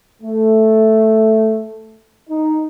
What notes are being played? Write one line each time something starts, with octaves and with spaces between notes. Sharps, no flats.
A3
D#4